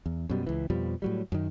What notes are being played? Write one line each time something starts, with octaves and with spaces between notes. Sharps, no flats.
E2
F#2 B2 G3
C#2 E3
F2 B2 F3 G3
A2 F#3 G3
F#2 D#3